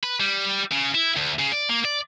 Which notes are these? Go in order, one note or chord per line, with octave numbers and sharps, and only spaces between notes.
B4
G3
C#3
E4
D2
C#3
D5
A#3
D5